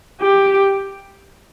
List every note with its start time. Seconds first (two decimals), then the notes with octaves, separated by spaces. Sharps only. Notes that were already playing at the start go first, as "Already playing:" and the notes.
0.21 G4